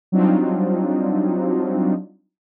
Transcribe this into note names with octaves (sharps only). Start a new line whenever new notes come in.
F#3 G3 C4 D4 D#4 F4